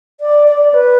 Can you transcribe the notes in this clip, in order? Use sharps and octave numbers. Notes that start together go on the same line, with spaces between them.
D5
D5
B4